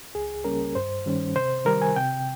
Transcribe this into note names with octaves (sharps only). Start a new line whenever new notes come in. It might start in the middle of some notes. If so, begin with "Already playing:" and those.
C#2 G#4
C#3 G3 A#3 C#4 A#4
G2 C5
D#3 G3 C#4
C3 C5
D#3 G3 A#4
G#5
C3 G5